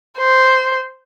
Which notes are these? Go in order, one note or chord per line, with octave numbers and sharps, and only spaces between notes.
C5